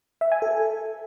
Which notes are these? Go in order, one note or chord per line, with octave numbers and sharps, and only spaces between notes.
E5
G#5
A4